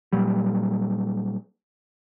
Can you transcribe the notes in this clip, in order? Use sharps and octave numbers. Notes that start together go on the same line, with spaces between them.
A#2 F#3 G3